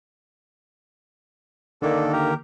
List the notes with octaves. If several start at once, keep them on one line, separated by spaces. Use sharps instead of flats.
D3 D#3 A#3 D4 A4
G4 A#4